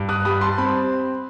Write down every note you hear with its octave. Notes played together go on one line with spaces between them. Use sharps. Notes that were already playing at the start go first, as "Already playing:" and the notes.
Already playing: G2
D#6 F#6
G3 B5 D#6
A5 C6
C4 B5